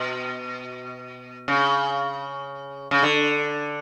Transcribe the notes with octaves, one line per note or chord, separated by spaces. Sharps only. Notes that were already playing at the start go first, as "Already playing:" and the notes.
Already playing: B2
C#3
C#3
D3